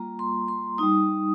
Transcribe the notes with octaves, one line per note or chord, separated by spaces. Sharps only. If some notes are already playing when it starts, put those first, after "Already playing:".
Already playing: G3 A#3 F4 A#5
C6
C6
G3 D#4 D#6